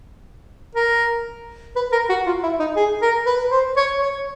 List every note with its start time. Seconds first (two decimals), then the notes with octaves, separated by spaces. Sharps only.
0.75 A#4
1.76 B4
1.92 A#4
2.09 F#4
2.26 F4
2.43 E4
2.60 D#4
2.76 G#4
3.02 A#4
3.26 B4
3.52 C5
3.77 C#5
4.02 C#5